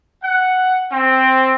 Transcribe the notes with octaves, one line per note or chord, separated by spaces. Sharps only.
F#5
C4